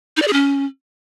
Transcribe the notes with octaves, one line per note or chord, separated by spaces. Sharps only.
D#4
D5
G#4
C#4